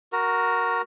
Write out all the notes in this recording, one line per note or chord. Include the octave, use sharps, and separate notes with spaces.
F#4 A#4